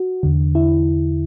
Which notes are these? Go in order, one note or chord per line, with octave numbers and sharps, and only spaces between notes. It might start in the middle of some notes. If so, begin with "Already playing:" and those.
Already playing: F#4
E2 D3
E4